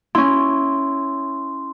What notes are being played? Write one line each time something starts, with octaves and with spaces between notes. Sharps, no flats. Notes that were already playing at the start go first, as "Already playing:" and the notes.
C#4 E4 C6